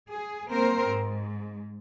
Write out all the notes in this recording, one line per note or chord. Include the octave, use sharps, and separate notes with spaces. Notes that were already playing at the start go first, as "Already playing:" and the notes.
G#4
A#3 C4 A#4 C5
G#2